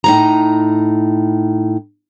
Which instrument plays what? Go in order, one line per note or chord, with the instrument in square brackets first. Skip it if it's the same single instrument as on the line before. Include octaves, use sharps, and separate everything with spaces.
[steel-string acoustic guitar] A2 D#4 A#5